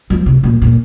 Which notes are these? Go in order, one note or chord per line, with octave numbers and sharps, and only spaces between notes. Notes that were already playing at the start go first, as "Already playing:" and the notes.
F3
C3
A#2
A#2